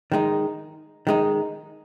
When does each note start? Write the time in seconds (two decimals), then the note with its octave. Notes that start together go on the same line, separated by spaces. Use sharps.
0.12 D#3 G#3 D#4
1.07 D#3 G#3 D#4